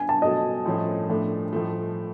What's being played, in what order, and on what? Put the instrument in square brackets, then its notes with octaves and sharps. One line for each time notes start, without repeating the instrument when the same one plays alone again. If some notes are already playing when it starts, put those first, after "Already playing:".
Already playing: [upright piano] G#5
A5
[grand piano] B2 F#3 A3 [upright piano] D#5
[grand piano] A2 F3 A3 C#4
A2 F3 A3 D4
A2 F3 A3